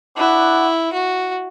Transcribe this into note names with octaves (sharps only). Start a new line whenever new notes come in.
D4 E4 F#4 B4 F#5
F#4